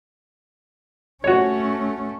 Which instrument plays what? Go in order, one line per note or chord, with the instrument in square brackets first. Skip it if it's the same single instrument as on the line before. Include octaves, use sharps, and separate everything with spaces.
[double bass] A3 C#4 [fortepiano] F#4 C#5